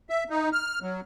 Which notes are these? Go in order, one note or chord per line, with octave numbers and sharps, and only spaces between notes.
E5
D#4
F6
F#3